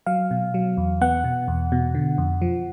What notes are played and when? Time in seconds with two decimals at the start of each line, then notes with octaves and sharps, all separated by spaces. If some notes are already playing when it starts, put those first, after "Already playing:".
0.06 F#3 F5
0.31 B2
0.54 F#3
0.77 E2
1.01 B3 F#5
1.24 B2
1.48 E2
1.72 B2
1.95 D3
2.18 F2
2.42 F3